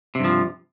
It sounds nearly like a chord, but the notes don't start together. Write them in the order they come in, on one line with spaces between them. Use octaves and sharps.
C3 G2 F3